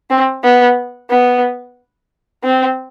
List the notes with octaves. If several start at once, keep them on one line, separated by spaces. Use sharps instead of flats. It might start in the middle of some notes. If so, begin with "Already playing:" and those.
C4
B3
B3
C4